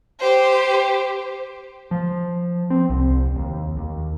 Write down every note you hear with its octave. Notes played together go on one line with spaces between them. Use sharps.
G4 C5
F3
C4
C2
D#2
D#2